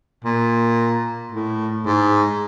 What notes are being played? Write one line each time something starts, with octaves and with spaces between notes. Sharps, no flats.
A#2
A2
G#2